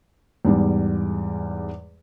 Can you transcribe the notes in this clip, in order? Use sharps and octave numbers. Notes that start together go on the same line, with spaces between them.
E2 G#2 G3